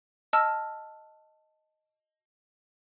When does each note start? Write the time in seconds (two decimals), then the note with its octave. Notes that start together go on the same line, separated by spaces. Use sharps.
0.33 D#5 A5 E6 F6